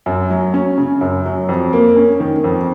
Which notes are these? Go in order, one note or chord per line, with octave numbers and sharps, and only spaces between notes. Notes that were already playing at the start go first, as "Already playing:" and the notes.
F#2
F#3
C#4
C#3
F#2
F#3
F2
A#3
C#4
D#3
F2